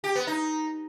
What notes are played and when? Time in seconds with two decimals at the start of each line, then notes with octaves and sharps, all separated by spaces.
0.04 G4
0.15 B3
0.27 D#4